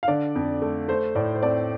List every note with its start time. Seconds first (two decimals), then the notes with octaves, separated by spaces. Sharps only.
0.03 F5
0.08 D3 D5
0.35 F2
0.62 A3
0.88 A3 C5
1.15 A2 D5
1.35 C5
1.43 C4 D5